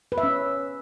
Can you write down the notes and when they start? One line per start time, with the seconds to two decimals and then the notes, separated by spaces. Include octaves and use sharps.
0.12 B4
0.18 E5
0.23 C#4